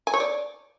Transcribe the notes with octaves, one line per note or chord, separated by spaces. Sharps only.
G#5
C#5
D5